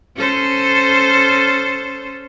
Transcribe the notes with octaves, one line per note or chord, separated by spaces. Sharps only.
C#4 A4 C5